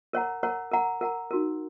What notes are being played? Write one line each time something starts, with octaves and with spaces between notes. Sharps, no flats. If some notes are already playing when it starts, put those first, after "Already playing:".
A#4 C#5 F#5 A#5
A#4 C#5 F#5 A#5
A#4 F#5 A#5
A#4 F#5 A#5
D#4 F#4 A#4